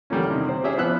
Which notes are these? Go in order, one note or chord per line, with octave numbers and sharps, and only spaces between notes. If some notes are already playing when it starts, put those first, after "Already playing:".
D3 E3 G3 A3 A#3 C#4
C3 D#3
C5
G#3 C#4 G4 G#4 C5 E5
F3 B3 E5 E6 F#6